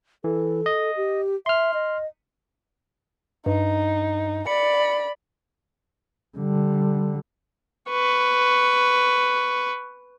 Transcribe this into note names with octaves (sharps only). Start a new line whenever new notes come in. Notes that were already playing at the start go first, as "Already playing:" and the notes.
E3 A4
D#5
G4
E5 C6 F6
D#5
G2 D#4
D5 B5 C#7
D3 G3
B4 C#6